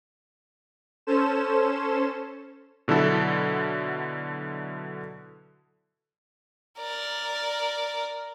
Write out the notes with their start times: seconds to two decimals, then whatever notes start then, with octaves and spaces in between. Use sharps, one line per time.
1.07 C#4 A4 C5 E7
2.88 B2 D3 F#3 E4 A4
6.79 A#4 D5